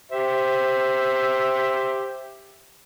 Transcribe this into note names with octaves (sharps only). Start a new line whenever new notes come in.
G4 C5 E5